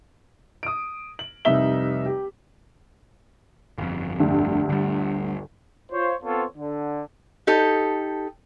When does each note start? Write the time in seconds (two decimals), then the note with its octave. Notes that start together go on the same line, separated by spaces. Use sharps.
0.63 D#6 D7
1.19 F#7
1.45 F1 C2 G3 D#4 E5 G7
2.06 G4
3.78 G1 F2
4.20 D2 G2
4.69 D3 G3
5.92 F4 C5 C#5
6.23 B3 C4 F4 A4 C5 C#5
6.57 D3
7.47 D#4 G4 A4